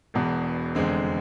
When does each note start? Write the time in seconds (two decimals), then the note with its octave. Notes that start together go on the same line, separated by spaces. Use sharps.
0.14 E1 E2 B2
0.75 F1 E2 D3 G#3 C4